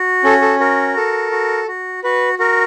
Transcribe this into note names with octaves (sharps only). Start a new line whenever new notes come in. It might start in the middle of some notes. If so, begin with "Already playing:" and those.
Already playing: F#4
C#4 A4
A4
F#4 A#4
A4
F#4
F#4
F#4 B4
F#4 A#4